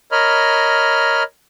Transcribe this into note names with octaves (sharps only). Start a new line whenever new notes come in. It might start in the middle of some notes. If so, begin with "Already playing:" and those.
A#4 C#5 D#5 B5 F6